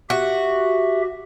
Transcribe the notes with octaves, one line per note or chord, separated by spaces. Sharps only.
F#4 G4 E5